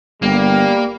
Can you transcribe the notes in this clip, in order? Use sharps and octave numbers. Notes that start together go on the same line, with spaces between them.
G1 G3 A#3